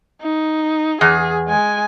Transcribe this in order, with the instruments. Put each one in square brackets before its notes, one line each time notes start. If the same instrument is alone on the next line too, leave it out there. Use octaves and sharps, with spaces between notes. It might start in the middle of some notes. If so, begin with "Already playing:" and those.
[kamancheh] D#4
[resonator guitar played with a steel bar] E2 [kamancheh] G#4
[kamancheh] G#3 G#5